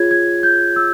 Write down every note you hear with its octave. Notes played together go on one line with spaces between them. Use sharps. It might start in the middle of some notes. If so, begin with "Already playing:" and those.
Already playing: F4 G#4 C#5 G#6
G#6
G6
E6